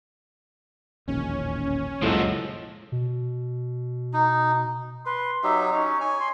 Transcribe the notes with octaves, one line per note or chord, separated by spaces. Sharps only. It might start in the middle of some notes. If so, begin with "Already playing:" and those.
E1 A#1 D#2 C#4
C#2 F#2 A#2 F3 F#3 G#3 E4 A4
B2
D#4
B4 C6
F#3 D#4 G4 E5
C#4 D#4
C#5 G#5
C6